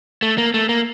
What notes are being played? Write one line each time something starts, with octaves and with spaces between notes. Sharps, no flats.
A3
A#3
A3
A#3